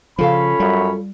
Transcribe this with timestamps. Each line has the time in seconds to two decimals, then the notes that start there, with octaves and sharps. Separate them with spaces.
0.19 C#3 F3 C#4 F4 A4 C#5 F5 B5
0.60 F#2 G3